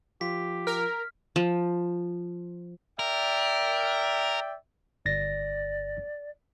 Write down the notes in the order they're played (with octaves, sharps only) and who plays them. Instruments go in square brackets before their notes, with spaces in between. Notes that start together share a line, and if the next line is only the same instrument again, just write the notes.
[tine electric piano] F3 F4 [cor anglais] G4 [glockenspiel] B6
[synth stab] A#4 [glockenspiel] F6
[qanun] F3
[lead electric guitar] A#4 [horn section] D5 E5 G5
[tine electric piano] G1 A6 A#6 [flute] D5